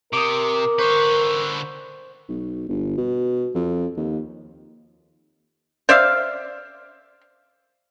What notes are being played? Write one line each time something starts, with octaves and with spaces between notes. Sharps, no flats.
C3 A#4 D6 D#6
D3 B4 C5 C#6
B1
G1
B2
F2
D#2
C5 D5 E5 F5